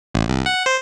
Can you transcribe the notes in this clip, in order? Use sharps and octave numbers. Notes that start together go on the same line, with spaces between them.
A1
C2
F#5
C5